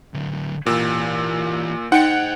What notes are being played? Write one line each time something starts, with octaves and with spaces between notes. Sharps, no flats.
D3 F#3
A#2 E3 G4 E6
D#4 C5 D#5 F#5 G5 C#7